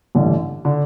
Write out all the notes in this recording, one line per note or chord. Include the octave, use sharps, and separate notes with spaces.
A1 G2 D3
D3